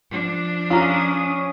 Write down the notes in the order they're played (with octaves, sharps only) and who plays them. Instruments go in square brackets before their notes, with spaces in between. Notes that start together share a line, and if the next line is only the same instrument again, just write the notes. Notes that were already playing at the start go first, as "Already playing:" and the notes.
[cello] F3 D4
[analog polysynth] C#4 D#6 [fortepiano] F4 A#5